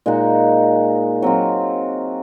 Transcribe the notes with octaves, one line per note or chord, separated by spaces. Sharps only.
A#2 G#3 D#4 F#4
F#3 C4 F4